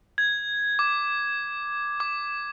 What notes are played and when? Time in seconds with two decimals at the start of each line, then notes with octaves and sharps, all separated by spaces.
0.18 G#6
0.79 D6
2.00 D6